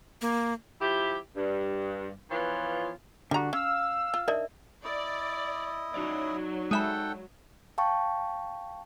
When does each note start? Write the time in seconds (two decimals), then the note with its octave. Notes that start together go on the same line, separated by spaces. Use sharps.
0.22 A#3
0.81 F3 E4 G4
1.35 G2
2.30 E3 F3 B3 F4 C#5
3.31 D3 G3 F#4 A#5
3.53 C#4 F5 E6
4.14 F4
4.28 D4 D#4 A#4 D5 E5
4.84 E4 D5 D#5
5.94 F#3 D#4 C#5 D5
6.71 G#3 A4 E5 F#5 G5 B5
7.78 F5 G5 A5 C#6